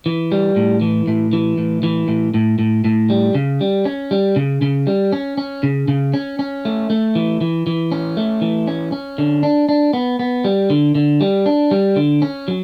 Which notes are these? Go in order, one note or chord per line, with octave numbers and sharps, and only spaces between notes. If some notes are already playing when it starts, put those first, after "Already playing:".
E3
G3
A2
E3
A2
E3
A2
E3
A2
A2
A2
A2
G3
C#3
G3
C#4
G3
C#3
C#3
G3
C#4
C#4
C#3
C#3
C#4
C#4
A3
A3
E3
E3
E3
C#4
A3
E3
C#4
C#4
D3
D4
D4
B3
B3
G3
D3
D3
G3
D4
G3
D3
C#4
F#3